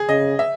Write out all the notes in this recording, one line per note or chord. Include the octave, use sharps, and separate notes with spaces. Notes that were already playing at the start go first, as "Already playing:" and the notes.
Already playing: G#4
C#3 D#5
E5